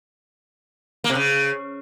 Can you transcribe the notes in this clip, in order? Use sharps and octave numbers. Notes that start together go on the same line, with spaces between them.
A#3
C3
C#3